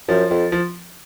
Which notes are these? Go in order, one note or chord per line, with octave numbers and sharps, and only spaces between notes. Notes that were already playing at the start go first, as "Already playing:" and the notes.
F#2 F3
F2
F3